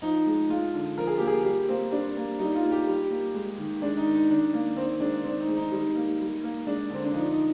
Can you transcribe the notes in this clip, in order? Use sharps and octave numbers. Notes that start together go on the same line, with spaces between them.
F3 D#4
G#3
G#3 F4
D3
F3 A#4
G#4
A#3 G4
G#4
G3 G4
A#3 C4
G3 D4
A#3
G3 D#4
F4
A#3
G4
G3
A#3
G#3
D#3
G#3 D4
D#4
D#3
D#4
D#3 D4
A#3
D#3 C4
G#3 D4
D#3 C4
D#4
G#3
D#4
G3 D#4
A#3
G3
A#3
G#3 D4
D3 C4
D4
F3 D#4
D#4